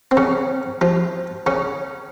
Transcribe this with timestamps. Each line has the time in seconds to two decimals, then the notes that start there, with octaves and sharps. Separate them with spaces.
0.11 C4
0.17 C#3 C#4
0.81 F3 F4
1.46 C#3 C#4